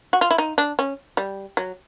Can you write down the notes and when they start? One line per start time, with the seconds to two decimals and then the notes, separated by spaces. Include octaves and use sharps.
0.13 F#4
0.21 F4
0.31 E4
0.38 D#4
0.58 D4
0.79 C#4
1.17 G3
1.57 F#3